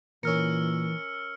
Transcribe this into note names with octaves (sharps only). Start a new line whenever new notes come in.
A#2 E3 C#4 A#4 E6 F6 C#7